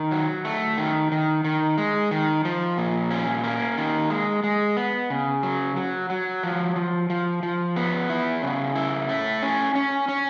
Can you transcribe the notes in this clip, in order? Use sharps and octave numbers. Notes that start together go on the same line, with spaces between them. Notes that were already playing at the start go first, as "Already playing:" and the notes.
Already playing: D#3
F#3
A3
D#3
D#3
D#3
G#3
D#3
F3
A#2
C#4
A#3
D#3
G#3
G#3
B3
C#3
F#3
F#3
F#3
F3
F3
F3
F3
B3
E4
C#3
E4
A3
C#4
C#4
C#4